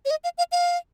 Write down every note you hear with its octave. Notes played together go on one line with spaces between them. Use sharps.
C#5
D#5
F5
F5
F5